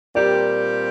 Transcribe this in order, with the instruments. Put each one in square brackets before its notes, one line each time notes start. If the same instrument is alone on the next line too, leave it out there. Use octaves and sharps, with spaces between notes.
[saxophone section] A#2 G3 C4 G4 [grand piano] A#4 D5